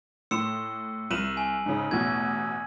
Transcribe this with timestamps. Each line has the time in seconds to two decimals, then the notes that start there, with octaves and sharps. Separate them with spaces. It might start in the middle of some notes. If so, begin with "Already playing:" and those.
0.31 A2 C6 E6 C#7 E7
1.11 C2 D#7 E7 F#7
1.37 G#5
1.66 G#2 C#3
1.91 A1 E2 B2 G#6